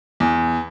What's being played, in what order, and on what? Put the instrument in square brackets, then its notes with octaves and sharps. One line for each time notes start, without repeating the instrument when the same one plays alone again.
[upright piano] E2